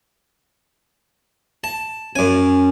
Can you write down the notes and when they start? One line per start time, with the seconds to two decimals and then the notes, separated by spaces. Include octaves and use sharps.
1.64 A5
2.16 F#2 C#4 G#5